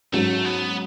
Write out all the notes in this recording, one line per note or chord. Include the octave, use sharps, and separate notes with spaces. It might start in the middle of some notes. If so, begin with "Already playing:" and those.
G#2 F#3 A3 C#4
B3